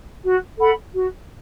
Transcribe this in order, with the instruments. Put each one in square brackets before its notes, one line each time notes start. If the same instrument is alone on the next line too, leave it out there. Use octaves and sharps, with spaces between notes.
[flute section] F#4
A4 F#5 B5
F#4